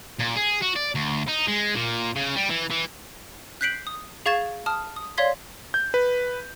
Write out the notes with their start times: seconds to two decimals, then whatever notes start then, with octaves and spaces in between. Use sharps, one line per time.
0.20 A#2
0.37 G#4
0.62 F#4
0.76 D5
0.95 D2
1.28 D#4
1.47 G#3
1.75 A#2
2.16 C#3
2.36 G3
2.49 E3
2.70 E3
3.61 F#6 G6 B6 C7 D7 F#7
3.87 D#6
4.26 G#4 F5 C#6 G#6 A6 E7
4.66 A5 D#6 F6
4.96 D#6
5.18 C#5 D5 F5 C6 G#6 B6
5.74 G6
5.94 B4